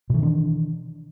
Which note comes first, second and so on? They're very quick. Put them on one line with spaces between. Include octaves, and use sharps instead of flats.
B2 E3 D#3 D4